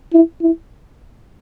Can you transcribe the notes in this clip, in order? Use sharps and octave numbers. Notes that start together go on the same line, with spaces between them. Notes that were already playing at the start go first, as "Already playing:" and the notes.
E4
E4